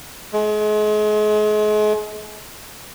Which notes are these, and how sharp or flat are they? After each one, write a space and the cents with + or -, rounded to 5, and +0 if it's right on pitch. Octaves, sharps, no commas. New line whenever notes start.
G#3 +35